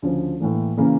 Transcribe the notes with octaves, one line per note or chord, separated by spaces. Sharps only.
D2 C#3 F3 C#4
A2 E3 A#3
C#3 E3 A#3 C#4